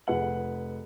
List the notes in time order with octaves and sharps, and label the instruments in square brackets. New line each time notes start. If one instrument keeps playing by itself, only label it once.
[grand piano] F1 G#4 B4 F#5 F#7